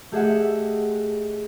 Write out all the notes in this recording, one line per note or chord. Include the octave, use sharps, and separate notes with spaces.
A3 G4 G#4 D#5 E5 F#5